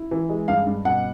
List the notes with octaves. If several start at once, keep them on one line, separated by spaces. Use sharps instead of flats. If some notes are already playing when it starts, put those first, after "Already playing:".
Already playing: E4
E3
G#3
G2 F5
G2
B2 F#5